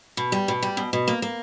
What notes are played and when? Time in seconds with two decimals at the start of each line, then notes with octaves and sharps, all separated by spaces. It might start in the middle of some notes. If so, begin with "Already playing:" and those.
0.17 B2
0.32 G3
0.48 B2
0.62 G3
0.77 B2
0.93 B2
1.08 A#3
1.22 A#3